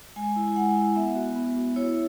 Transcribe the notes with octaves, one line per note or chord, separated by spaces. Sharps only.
G#3 G#5
E4
G#5
G#3 F#5
E4
B3 E5
F#4
B3
F#4
E4 C#5